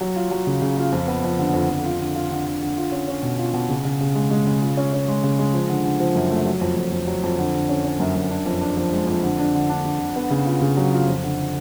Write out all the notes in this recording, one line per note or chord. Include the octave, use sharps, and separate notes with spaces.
F#3
F4
F#3
C#3
C#3
F4
F2
B3
F2
D3
F2
F2
F4
D3
F4
D3
D3
D3
F4
C#4
C#4
B2
F4
B2
C#3
C#3
C#3
G#3
G#3
C#3
F4
C#4
C#4
G#3
C#3
G#3
F3
D3
D3
F3
F#2
A3
F#3
F2
F2
F2
F#3
F2
D3
D3
C#4
C#4
F#2
F#2
D4
F2
D4
F3
G#3
F2
D3
D4
D3
D4
D3
D3
B3
C#3
F4
C#3
F#3
F4
F2
D3